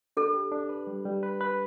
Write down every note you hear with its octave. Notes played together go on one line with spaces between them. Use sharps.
D4 A4
G4
D4
B4
G3
G3
B4
B4